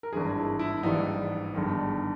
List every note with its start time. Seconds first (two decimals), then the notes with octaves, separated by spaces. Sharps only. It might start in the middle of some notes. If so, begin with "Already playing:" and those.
0.03 A#4
0.13 G#1 G2 E3 G#3 G#4
0.36 E4
0.59 E4
0.83 A#1 G#2 E3 G3 D#4
1.54 G1 G2 D#3 G#3